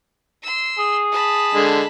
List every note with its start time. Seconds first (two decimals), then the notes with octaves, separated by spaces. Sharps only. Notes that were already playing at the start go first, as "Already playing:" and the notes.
0.42 C6 E6
0.78 G#4
1.11 A5 B5
1.54 D3 G#3